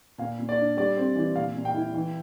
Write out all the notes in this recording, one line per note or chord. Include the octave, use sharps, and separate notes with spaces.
A#2 F5
A#2
D5
D4
G3 D5
C4
E3
A#2 F5
A#2
G5
E4
E3